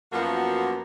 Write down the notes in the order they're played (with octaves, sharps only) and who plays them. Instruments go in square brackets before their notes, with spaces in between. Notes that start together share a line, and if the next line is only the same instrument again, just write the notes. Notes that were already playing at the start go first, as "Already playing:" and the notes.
[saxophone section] F#2 F3 A#3 B3 F4 F#4